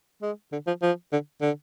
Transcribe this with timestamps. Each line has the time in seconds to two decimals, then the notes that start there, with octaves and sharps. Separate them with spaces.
0.22 G#3
0.52 D3
0.67 F3
0.82 F3
1.12 D3
1.42 D3